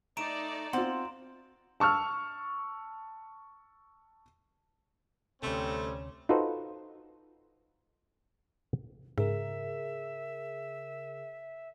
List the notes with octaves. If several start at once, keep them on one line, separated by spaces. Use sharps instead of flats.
A3 D#4 D5 A#5 D7 E7
C4 F4 F#5 C6
A5 C#6 E6 F6
D2 C3 G3 A3 C4 C#4
D#4 F4 F#4 A4 B4 C5
G#2 C#3 G#4 A#4 E5